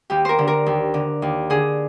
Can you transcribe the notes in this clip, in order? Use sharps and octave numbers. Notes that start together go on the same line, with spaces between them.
D#2 G4
A#4 C5
D3
A#4
D#2
D3
D#2
D3 G#4